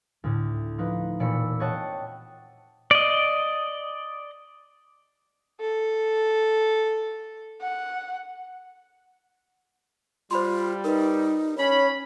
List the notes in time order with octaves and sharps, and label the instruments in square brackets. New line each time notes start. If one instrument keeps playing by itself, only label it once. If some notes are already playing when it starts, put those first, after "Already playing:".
[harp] D2 A2
F3 D#4 B4
E1 A#2 D5 B5 E6 C#7
C4 C#5 D#5 F#5 G5 A5
[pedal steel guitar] D5 D#5
[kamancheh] A4
F#5
[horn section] G3 [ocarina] F4 [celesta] C5 B5 C6
[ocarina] D#4 [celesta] A#4 B4
[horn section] C#4 B5 [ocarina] C#5